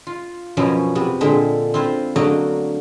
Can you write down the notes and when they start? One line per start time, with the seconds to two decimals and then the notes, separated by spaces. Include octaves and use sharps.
0.07 F4
0.57 F#2 B2 F3 F#3 B3 C#4
0.95 C3 B3
1.21 A#2 D3 G#3 A4 E5 G5
1.74 C4 E4 F4 C5
2.16 D3 F#3 A3 A#3 F#4 D#5